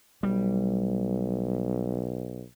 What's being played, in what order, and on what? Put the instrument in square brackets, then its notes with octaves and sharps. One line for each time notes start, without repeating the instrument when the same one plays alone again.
[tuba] B1 [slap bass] G3